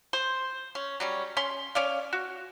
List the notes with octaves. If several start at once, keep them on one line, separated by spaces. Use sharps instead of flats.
C5
C#4
F#3 G3 C#4
C#4 C6
C#4 D5 F5
F#4